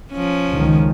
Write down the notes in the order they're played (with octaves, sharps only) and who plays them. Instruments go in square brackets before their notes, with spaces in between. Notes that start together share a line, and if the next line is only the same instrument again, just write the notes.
[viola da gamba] F3 C#4
[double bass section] C#2 D#3